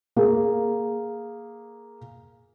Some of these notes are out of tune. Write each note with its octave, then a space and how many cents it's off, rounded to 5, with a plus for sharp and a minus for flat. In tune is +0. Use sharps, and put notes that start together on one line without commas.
A#3 +0 G#4 +0